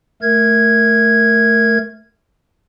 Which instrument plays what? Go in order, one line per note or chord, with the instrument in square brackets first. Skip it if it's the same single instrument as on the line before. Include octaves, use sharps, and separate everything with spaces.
[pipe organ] A3 A#4 G#6